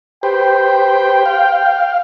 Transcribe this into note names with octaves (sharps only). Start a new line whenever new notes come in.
G4 B4 C5 G5
F5